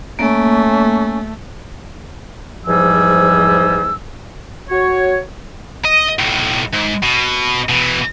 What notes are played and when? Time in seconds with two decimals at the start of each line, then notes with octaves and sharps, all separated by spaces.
0.19 A3 A#3 C#4
2.66 E2 G#2 F3 G3 G#5 E6
4.70 F#4 C#5
5.85 D#5
6.19 B1 A2
6.73 G#2
7.03 B2
7.69 B2 E3